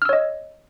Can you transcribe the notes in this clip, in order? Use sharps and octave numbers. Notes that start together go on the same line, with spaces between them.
C#5 D#5 E6 F6